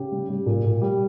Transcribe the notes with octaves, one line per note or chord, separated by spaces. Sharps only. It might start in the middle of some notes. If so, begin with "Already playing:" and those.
Already playing: C#3 G4
G3
G3
A#2
A#2
G3